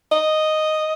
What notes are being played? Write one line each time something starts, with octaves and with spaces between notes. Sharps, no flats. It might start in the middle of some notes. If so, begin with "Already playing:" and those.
D#5